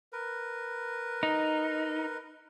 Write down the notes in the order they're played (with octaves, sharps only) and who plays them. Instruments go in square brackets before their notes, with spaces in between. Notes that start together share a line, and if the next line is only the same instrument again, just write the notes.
[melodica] A#4 B4
[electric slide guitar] D#4